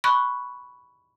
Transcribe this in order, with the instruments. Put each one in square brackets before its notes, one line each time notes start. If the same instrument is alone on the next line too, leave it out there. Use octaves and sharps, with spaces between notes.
[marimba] B5 C#6 F#6